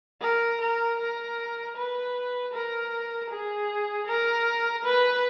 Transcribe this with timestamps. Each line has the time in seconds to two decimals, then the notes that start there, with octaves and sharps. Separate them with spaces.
0.21 A#4
0.60 A#4
0.99 A#4
1.76 B4
2.53 A#4
3.30 G#4
4.06 A#4
4.84 B4